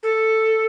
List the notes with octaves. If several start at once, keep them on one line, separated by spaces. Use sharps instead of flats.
A4